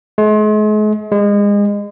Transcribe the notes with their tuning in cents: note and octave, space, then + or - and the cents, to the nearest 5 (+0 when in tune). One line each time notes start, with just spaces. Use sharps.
G#3 +40
G#3 -30